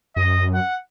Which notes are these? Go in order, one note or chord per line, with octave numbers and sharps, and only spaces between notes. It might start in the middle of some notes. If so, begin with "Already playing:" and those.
F#2 D#5
F#5